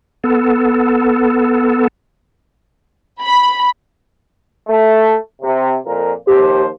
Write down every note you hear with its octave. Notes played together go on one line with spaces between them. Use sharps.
B3 A4
B5
A3
C3
F2 A#2 A#4
D#2 F3 G4 C5